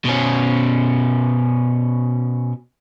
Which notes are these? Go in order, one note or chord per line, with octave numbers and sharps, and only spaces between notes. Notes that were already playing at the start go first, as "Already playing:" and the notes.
B2 C#4